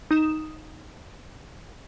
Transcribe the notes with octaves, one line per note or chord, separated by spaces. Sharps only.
D#4 D#6 E7